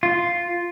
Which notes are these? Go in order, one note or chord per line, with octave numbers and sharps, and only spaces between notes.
F4